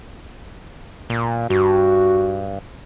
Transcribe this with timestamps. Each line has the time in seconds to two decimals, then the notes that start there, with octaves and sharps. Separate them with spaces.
1.10 A#2
1.50 G2 F#4